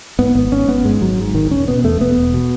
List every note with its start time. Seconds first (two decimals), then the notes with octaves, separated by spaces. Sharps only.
0.19 G#2 B3
0.35 G#1 B3
0.52 G#2 C#4
0.68 G#1 B3
0.85 G#2 G#3
1.01 G#1 F#3
1.18 G#2
1.34 G#1 D#3
1.51 E1 C#4
1.68 B2 B3
1.84 E2 A3
2.00 E1 B3
2.18 E1
2.34 B2